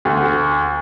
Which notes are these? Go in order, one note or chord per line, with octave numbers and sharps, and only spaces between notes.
D2